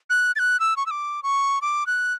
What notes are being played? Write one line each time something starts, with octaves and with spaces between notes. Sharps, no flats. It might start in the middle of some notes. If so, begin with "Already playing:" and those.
F#6
A6
F#6
E6
C#6
E6
D6
C#6
D6
F#6